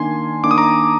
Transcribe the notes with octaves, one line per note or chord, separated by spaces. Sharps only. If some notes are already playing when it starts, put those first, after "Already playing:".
Already playing: D#3 A#3 D4 G#5 C6
D#3 A#3 D4 D6
D#6
A#5 D6